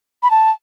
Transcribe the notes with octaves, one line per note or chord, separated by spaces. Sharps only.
B5
A5